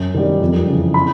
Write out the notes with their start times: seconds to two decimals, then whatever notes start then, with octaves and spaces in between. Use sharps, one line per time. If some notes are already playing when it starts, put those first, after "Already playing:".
Already playing: F#2
0.15 D#3 G3
0.41 F2
0.68 C#3 E3
0.94 B5